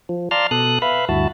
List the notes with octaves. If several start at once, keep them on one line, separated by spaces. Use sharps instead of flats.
F3
D5 F5 A5 A#5 C6 F6
B2 A4 D#6 F#6
B4 E5 F5 B5
D2 G2 E4 F#4 A5